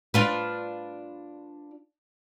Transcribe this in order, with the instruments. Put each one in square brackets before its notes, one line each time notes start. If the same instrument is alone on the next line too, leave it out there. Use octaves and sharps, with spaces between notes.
[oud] D4 F4 B4